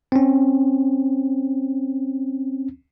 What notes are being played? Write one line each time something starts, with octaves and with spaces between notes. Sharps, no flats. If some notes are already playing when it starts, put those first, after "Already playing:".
C4 C#4